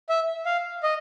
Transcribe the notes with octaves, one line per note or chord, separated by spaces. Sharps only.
E5
F5
D#5